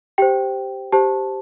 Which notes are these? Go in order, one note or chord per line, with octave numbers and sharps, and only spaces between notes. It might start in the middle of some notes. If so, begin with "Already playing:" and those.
G4 C5 G5
G4 C5 A5